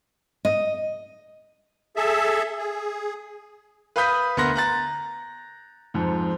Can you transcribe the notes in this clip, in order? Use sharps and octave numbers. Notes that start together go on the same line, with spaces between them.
D#5
G#4 A4 E5
G#4
B4 F5 B5 D#6 G6 B6
D2 B3 A#4 C6 F#6 A#6
A#5 F#6 A6
F2 G#2